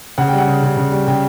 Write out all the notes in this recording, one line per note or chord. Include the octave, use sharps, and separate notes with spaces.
C#3 F#5
G5
G3
F#5
C#3
C#3
C#3
G3
C#3 G5